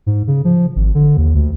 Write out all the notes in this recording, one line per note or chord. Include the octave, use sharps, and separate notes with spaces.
G#2
C#3
F3
G#1
D3
D#2
D2